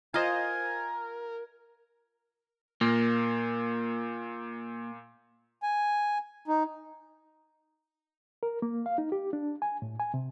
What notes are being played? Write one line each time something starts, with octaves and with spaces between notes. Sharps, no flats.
F4 A#4 C5 D#5 F5 G#5
A#2 A#3
G#5
D#4
A#4
A#3
F5
D#4
G4
D4
G#5
A2
G#5
C3